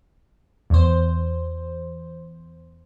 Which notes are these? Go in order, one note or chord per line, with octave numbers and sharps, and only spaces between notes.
E2 C5